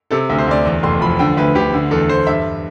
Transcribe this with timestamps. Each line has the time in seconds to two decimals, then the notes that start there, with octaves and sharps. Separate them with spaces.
0.11 C3 A4
0.29 D2
0.38 C5
0.47 D2 D5
0.65 E2
0.83 F1 C6
1.01 F3 B5
1.19 D3 G5
1.37 D2 B4
1.55 D2 G4
1.73 D3
1.91 E2 A4
2.09 E2 C5
2.27 G2 E5